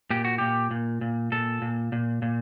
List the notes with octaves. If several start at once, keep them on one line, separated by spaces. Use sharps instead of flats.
A#2 G4
F#4
A#2 G4
A#2
A#2
A#2 A4
A#2
A#2
A#2